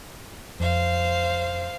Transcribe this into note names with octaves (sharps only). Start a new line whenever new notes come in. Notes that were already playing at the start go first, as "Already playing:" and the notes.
F2 C5 F5